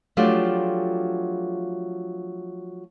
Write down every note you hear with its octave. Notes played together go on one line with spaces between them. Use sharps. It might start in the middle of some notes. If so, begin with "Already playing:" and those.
F3 F#3 A3 D4 F4 G4